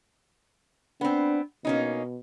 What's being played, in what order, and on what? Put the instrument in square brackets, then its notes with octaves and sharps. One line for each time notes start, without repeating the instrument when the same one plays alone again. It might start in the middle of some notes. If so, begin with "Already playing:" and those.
[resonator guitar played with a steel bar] B3 C4 [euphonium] D4
[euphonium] B2 [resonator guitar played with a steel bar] A#3 C#4 D#4